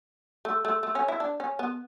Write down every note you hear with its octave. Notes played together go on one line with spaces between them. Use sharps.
A3
A3
A3
C#4
E4
D4
C#4
B3